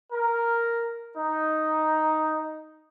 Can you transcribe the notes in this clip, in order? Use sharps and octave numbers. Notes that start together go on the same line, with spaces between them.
A#4
D#4